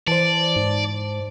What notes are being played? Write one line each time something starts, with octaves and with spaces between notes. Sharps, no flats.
E3 C5 D5 A5
G#2